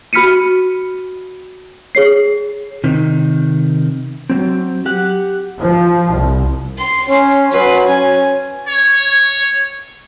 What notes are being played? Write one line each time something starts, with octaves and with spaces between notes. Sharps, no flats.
F#4 B5 F6 B6 C#7 D#7
G#4 C#5 C7
C3 D#3
F#3 C4
G4 F#5
F3
C2
C6
C#4
F#3 B4 C6
C#4 G#5
C#5